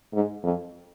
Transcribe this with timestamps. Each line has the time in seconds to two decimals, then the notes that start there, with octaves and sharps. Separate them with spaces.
0.13 G#2
0.43 F2